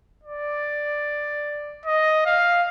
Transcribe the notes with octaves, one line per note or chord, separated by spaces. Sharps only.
D5
D#5
F5